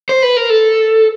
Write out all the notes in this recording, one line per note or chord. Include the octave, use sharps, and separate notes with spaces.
C5
B4
A#4
A4